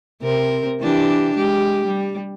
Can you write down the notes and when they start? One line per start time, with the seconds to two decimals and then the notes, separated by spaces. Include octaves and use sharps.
0.23 C3 C4 A#4
0.80 E3 D4 G4
1.37 G#3 G4
1.86 G3